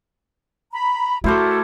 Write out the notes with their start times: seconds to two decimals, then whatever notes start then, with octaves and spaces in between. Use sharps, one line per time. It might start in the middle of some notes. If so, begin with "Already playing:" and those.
0.72 A#5 B5
1.24 A3 E4 F#4 A4 A#4 C5 D6